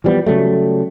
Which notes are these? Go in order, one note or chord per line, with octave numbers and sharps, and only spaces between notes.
E3 F3 G3 B3
C#3 F#3 G3 A3